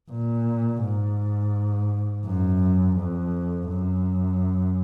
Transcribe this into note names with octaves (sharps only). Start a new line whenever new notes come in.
A#2
G#2
F#2
F2
F#2